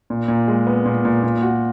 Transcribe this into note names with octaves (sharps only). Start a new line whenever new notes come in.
A#2
A#2
G#3
B3
A#2
A#2
A#2
F#4